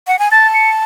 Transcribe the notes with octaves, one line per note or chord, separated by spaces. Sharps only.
F#5
G#5
A5 A6
C#7